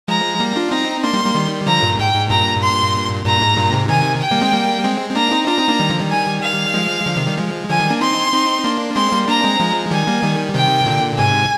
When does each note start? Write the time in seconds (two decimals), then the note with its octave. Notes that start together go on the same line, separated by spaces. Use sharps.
0.08 F3 G#3 A#5
0.40 G3 A#3
0.56 D4 F4
0.71 C4 D#4 A#5
1.03 A#3 D4 C6
1.14 G3 A#3
1.24 G3 A#3
1.35 D#3 G3
1.67 D3 F3 A#5
1.83 G2 A#2
1.99 G#2 G5
2.14 G#2
2.30 G2 A#2 A#5
2.62 C6
3.25 G2 A#2 A#5
3.41 G#2
3.57 G2 A#2
3.73 G#2 C3
3.89 C3 D#3 G#5
4.21 G5
4.31 G3 A#3
4.41 G#3 C4
4.52 G3 A#3
4.84 G#3 C4
5.10 C4
5.15 A#3 D4 A#5
5.31 C4 D#4
5.47 D4 F4 A#5
5.58 C4 D#4
5.68 A#3 D4
5.80 D#3 G3
5.89 D3 F3
6.00 D#3 G3
6.11 G#5
6.42 F5
6.74 F3 G#3
7.06 D3 F3
7.16 C3 D#3
7.27 D#3 G3
7.37 F3 G#3
7.70 D3 F3 G#5
7.79 D#3 G3
7.90 A#3 D4
8.01 C4 D#4 C6
8.32 C4 D#4
8.64 A#3 D4
8.96 G#3 C4 C6
9.12 G3 A#3
9.28 A#3 D4 A#5
9.44 G#3 C4
9.59 F3 G#3
9.91 D#3 G3 G#5
10.07 G3 A#3
10.23 D#3 G3
10.54 C3 D#3 G5
10.86 A#2 D3
11.18 G#2 C3 G#5